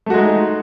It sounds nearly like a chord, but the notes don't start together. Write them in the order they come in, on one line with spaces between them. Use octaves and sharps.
A3 F#4 G#3 D#4